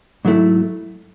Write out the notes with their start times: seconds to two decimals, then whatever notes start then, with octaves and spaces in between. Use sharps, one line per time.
0.25 G#2 F#3 A3 E4